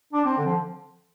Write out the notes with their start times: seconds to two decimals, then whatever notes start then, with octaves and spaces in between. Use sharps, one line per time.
0.13 D4
0.25 C4
0.38 D3
0.46 F3